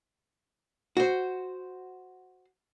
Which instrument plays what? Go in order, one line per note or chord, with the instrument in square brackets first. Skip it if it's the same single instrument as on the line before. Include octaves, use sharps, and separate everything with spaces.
[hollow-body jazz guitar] F#4 C5